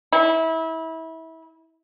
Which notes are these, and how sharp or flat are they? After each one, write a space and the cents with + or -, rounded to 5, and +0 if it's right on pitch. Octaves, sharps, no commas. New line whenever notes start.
E4 -25